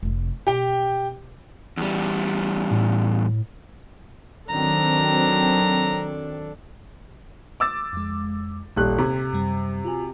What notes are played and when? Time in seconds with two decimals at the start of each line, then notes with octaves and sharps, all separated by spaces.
0.03 F1 C3
0.47 B2 G4 G5
1.77 E2 G3
2.71 A2
4.50 D#3 F#3 C4 D4 A4 A#5
7.60 D6 E6 A6
7.93 F2 G#3
8.76 D#1 A1 G3 F#6
8.99 C3 G#6 B6
9.33 F#2 G3
9.85 F4 F#4 G#5